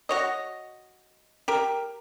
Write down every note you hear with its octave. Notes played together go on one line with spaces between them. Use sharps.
F#4 C#5 D#5
G4 A#4